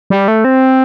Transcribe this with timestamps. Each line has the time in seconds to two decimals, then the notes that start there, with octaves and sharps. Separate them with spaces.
0.10 G3
0.28 A3
0.45 C4